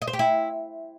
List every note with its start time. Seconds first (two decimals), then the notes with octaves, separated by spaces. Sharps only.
0.02 D#5
0.07 C5
0.13 G4
0.19 E4